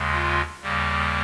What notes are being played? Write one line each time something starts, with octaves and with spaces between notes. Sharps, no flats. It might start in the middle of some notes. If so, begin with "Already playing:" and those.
Already playing: D#2 C#3 G#3
F4
D#2 C#3 G3 A#3